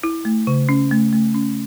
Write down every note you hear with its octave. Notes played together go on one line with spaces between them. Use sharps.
E4
A3
C#3
C#4
A3
A3
C#4